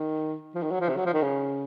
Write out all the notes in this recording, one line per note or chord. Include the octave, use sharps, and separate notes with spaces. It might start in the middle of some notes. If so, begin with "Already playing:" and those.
Already playing: D#3
F3
D#3
F#3
F3
C3
F#3
F3
D#3
C#3